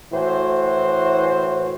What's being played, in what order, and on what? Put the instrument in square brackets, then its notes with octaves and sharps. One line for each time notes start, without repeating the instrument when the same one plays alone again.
[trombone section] A2 E3 F#4 C5